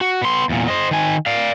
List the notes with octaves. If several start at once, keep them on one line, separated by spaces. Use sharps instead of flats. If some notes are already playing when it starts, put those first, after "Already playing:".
F#4
B3 C6
E2 A#2
C5 D#5
D#3 G#5
D5 F5